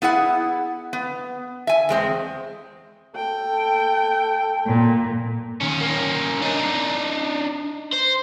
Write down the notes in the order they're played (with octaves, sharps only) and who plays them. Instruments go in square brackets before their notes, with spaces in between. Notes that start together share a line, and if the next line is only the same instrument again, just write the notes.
[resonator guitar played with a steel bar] B3 E4 G#4 F#5
B3
E5 G#5
E2 G#3 C4
[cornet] A4 [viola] G5
[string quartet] A#2
[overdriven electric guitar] D#3 C#4
A#3 C#4
D4 D#4
C5